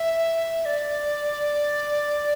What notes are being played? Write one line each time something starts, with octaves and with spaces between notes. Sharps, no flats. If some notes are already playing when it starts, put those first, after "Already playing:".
Already playing: E5
D5